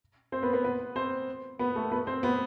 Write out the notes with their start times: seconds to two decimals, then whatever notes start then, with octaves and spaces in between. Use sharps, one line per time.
0.32 C4 C5
0.43 B3 B4
0.53 B3 B4
0.64 B3 B4
0.96 C4 C5
1.59 B3 B4
1.76 A3 A4
1.92 B3 B4
2.07 C4 C5
2.23 B3 B4